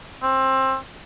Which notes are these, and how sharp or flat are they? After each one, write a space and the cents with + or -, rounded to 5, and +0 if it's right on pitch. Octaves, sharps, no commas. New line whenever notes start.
C4 +20